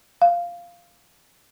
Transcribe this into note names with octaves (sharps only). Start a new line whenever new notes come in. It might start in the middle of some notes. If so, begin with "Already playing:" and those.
F5